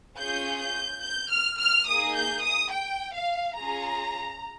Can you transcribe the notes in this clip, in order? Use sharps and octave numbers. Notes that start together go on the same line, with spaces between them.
C#4 F4 G#4 G6
G6
G6
F6
F6
A#3 D#4 G#4 D#6
G6
D#6
G5
F5
C#4 F4 G#4 A#5